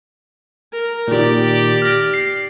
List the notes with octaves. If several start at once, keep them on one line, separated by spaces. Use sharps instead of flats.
A#4
A#2 D#3 G4 D5
F6 A#6
C7